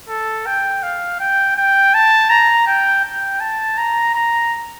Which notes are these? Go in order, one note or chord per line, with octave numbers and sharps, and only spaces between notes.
A4
G5
F5
G5
G5
A5
A#5
G5
G5
A5
A#5
A#5